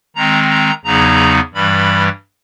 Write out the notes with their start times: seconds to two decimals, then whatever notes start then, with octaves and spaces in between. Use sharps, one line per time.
0.15 D#3 G#3 C4 A#5
0.50 A#5
0.84 E2 C#3 F#3 B3 D#4 A#5
1.54 G2 E3 G3 B5